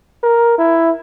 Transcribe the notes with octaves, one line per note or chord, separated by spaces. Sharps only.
A#4
E4